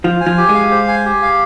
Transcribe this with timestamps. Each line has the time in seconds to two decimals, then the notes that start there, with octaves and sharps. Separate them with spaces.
0.04 F3 F4 C5
0.21 G#5
0.26 F3 F4
0.37 G4
0.48 G#3 G#4
0.54 F5
0.71 C5
0.88 G#5
1.05 G4
1.22 F5